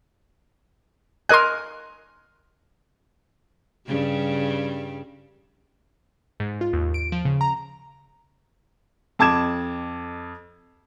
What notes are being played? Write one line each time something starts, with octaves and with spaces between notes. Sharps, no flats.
A#4 D#5 G#5 C6 F#6
G2 C#3 G3
G#2
F4
D#2
D7
F3
C#3
A#5
F2 A5 D6 G#6 E7